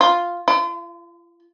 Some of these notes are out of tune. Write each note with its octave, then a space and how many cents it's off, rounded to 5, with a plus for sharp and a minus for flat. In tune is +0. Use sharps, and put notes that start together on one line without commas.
F4 +0
F4 -40